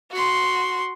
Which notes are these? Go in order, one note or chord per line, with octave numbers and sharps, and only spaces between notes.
F#4 C6